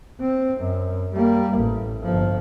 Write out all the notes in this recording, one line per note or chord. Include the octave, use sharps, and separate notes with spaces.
C4
F#2
G3 A#3
A1
G1 F3